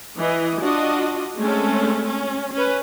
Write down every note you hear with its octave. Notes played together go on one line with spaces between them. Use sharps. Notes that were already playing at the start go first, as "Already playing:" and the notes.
E3 D#5
D4 F4 F#4 D#5
G#3 A3 C4 C#4 A4
C#4
C#4 B4